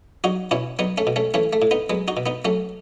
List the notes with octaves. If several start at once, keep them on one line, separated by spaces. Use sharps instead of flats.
F#3 D#4 F#4
B2 C#4 E4
F#3 B3 D#4
A3 C#4
B2
A3 C#4
E3 A3 C#4
A3
A2
B3 D#4
F#3 G#3 B3
D#4 F#4
B2
B3 D#4
F#3 A3 C#4